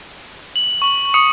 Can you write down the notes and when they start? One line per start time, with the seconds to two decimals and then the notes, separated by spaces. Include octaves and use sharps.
0.56 F#7
0.82 C#6 F#7
1.14 C#6 D#6 C#7